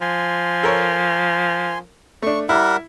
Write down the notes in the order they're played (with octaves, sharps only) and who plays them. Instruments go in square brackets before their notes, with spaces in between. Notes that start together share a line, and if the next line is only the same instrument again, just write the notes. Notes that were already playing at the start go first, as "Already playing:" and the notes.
[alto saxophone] F3 [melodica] G#5 C6
[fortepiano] A4 A#4 C#5
[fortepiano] A3 D4 [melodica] C#6
[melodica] G3 A#4 F#5 [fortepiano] E4